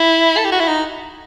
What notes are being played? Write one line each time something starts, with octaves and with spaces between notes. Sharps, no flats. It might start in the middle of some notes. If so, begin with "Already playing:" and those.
Already playing: E4
A4
G4
F#4
E4
D#4